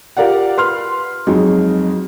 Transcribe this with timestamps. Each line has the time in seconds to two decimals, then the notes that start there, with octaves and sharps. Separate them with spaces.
0.17 F4 G4 A#4 D5 F5 F#5
0.57 B4 C6 F6
1.27 F2 F#3 G#3 D#4